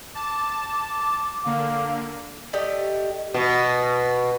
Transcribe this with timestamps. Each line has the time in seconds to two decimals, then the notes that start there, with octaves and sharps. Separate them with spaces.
0.15 A5 D6
1.45 D3 A#3 F5
2.53 A3 G4 D5 D#5
3.34 B2